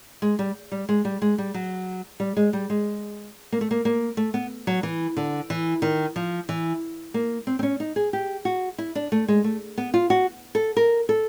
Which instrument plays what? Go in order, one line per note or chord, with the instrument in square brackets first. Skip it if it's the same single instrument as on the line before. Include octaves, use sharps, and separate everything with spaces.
[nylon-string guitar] G#3
G3
G3
G#3
G3
G#3
G3
F#3
G3
G#3
G3
G#3
A#3
A3
A#3
A#3
A3
B3
F#3
E3
D3
E3
D#3
F3
E3
A#3
C4
C4
C#4
D#4
G#4
G4
F#4
E4
D4
A3
G#3
A3
B3
F4
F#4
A4
A#4
A4